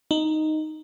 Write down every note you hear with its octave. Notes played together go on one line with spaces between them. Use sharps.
D#4